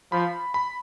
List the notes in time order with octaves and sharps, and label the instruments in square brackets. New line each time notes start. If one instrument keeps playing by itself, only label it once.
[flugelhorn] F3 [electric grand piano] B5
[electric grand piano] B5